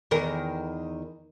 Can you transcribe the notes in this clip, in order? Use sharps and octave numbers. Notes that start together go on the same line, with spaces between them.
E2 D#3 A#4